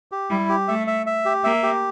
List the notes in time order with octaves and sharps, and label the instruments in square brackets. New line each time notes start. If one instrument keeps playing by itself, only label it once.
[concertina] G4
[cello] G3 [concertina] E4
[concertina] G4
[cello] A3 [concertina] E5
[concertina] E5
E5
G4
[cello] A#3 [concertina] E5
[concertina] G4